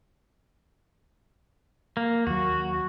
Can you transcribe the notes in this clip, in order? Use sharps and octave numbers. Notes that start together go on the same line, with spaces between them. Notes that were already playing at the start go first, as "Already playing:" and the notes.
A#3
D#2 F#3 F#4